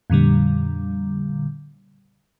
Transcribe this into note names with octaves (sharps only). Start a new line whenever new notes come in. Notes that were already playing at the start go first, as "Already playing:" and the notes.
F2 A#2 D3 G3